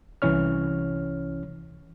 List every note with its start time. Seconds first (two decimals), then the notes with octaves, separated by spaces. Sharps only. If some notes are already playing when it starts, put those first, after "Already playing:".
0.22 C2 E3 C#4 C#5 F6